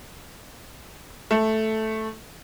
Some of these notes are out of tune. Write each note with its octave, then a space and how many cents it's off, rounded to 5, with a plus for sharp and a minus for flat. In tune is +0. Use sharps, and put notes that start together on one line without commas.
A3 -5